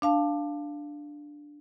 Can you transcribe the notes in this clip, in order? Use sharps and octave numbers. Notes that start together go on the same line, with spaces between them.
D4 F5 A5